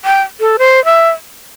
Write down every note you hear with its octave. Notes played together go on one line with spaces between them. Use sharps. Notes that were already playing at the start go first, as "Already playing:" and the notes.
G5
A4
C5
E5